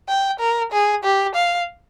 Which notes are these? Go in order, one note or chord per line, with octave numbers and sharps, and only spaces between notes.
G5
A#4
G#4
G4
F5